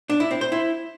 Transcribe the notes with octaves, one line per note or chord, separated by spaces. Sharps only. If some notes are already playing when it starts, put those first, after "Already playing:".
D4
E4
C4
C5
E4